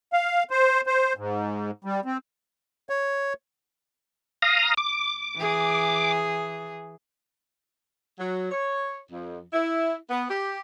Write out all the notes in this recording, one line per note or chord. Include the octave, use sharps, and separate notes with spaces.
F5
C5
C5
G#2
G3
C4
C#5
F5 A#5 D#6
D6
E3 G#4
F#3
C#5
F2
E4
B3
G4